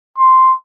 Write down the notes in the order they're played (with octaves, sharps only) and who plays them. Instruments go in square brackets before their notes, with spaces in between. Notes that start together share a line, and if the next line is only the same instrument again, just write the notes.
[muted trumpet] C6